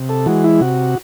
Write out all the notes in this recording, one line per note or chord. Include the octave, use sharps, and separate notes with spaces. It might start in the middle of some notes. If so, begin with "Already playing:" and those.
Already playing: C3
A4
E3 G#3 F#4
E4
C3 F#4